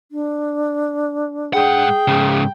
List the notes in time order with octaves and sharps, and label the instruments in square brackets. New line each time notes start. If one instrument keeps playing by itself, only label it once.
[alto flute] D4
[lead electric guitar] G#2 F#5 [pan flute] G#4 [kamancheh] G5
[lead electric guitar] G#2 C#3